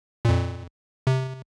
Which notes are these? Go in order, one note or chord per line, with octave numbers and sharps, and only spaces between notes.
F2 A#2
C3